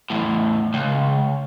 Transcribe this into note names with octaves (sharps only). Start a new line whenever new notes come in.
E2 A2
C#2